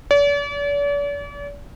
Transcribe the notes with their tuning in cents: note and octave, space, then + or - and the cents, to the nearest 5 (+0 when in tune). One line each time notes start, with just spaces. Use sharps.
D5 -45